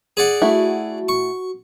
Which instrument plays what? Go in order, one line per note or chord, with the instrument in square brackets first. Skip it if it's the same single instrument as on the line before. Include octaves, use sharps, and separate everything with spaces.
[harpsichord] G#4 D5 F#5
[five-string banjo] A3 E4 [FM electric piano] F#4
[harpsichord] C#6